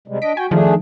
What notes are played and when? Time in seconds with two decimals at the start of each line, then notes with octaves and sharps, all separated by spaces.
0.08 C3 G3 G#3
0.22 D4 D#5 B6 D7
0.37 F#4 G5 G#5
0.51 D#3 F3 A3 D4 G#4